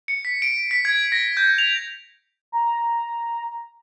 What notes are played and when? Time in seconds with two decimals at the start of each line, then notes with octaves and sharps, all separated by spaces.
0.08 C#7
0.25 B6
0.42 D7
0.71 B6
0.85 G#6
1.12 A#6
1.37 G6
1.58 F7
2.52 A#5